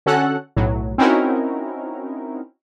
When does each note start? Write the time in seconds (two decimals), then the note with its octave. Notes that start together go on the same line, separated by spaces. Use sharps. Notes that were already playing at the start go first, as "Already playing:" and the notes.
0.06 D3 C#4 F#4 A4 F#5 F#6
0.56 B1 A2 F#3
0.98 C4 C#4 D#4 E4 F#4 A#4